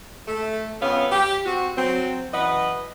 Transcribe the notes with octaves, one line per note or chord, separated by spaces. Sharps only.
A3 A4
F2 C#3 B3 C#4 F5
G4
C4 F#4
F#3 C4
F#2 E3 B4 D#5 F#5